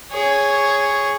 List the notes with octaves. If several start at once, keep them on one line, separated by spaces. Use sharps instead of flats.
G#4 C#5